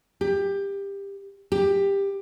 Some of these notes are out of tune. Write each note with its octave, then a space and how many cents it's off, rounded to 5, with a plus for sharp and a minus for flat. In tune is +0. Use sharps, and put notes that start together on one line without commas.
G4 +20
G4 +15